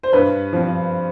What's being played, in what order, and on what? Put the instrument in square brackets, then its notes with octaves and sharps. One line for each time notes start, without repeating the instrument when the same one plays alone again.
[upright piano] C5
G2 B4
F3 C4